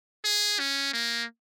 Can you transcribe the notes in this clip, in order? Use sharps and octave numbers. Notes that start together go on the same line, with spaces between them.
G#4
C#4
A#3